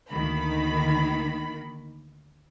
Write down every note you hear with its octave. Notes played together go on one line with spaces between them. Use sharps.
D2 D#3 A#3 B5